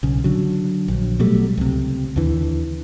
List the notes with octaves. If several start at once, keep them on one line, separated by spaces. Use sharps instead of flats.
B1 C#3
D3 F#3
A#1
B2 F#3 G3 A3
C#2 C3
D#2 D3 E3